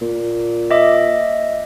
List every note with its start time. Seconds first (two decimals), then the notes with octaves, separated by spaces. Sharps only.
0.01 A#2
0.71 D#5 E5 D6